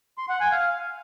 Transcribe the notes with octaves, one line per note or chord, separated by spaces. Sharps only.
C6
F#5
G#5
F5